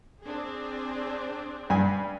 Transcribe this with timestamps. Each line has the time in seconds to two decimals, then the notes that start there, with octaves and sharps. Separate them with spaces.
0.25 C4 D4 G#4
1.70 G2 G#5